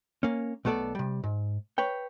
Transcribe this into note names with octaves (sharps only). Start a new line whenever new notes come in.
A#3 C#4
B1 A3 B3 A4 D5
C3 G3
G#2
B4 C#5 G5